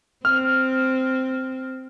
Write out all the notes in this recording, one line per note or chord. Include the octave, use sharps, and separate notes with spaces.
C4 F6